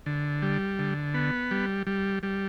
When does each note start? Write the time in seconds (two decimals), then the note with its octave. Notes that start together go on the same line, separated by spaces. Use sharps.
0.06 D3
0.42 G3
0.79 D3
1.14 B3
1.51 G3
1.87 G3
2.23 G3